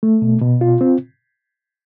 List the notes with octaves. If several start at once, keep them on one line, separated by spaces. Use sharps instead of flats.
A3
B2
B2
F4
C4